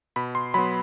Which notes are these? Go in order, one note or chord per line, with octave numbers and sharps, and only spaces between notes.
B2 B5
C6
F#3 B3 B5